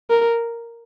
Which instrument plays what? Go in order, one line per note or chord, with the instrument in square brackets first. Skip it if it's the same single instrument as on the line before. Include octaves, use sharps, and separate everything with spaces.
[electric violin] A#4